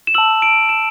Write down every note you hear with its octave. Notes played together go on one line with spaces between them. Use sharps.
E7
A5 E6 F#7
D7
E7